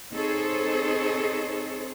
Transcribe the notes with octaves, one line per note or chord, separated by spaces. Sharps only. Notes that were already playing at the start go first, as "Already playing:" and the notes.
C4 D#4 G#4 A4 C5 C#5